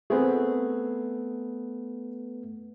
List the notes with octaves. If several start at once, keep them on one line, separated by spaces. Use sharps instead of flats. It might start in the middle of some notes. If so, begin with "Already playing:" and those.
A3 B3 C4 G#4 B4